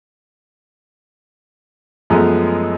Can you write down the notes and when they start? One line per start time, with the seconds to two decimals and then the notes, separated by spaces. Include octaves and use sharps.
2.10 F#2 F3 G#3 A3 B3